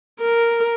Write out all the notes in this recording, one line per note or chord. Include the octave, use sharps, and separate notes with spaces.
A#4